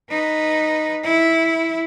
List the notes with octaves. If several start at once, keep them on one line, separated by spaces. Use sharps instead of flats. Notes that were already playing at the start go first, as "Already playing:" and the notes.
D#4 B4
E4